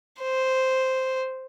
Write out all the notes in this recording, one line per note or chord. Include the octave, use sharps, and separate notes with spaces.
C5